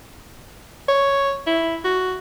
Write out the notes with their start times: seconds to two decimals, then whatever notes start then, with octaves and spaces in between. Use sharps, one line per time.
0.88 C#5
1.47 E4
1.85 F#4